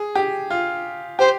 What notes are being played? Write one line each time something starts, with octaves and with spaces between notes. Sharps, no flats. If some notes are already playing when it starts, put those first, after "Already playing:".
Already playing: G#4
G4
F4
G4 C5